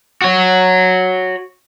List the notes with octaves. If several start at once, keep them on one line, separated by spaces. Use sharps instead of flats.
F#4 C#5